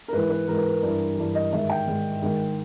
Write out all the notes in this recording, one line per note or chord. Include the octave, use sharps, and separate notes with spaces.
A#4
G#2 E3 B4
B4
G#2 E3 A#4
B4
A#4
G2 E3
G2 E3
D#5
G#2 D#3 E5
G5
G#2 D#3
G#2 D#3